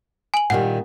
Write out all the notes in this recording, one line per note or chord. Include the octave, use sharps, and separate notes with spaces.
G#5 F#7
A#2 D#3 G3 F#5